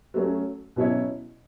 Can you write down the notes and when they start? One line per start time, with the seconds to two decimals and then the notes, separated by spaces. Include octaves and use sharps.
0.14 F#3 A3 C#4
0.76 B2 F#3 C#4 E4 C#5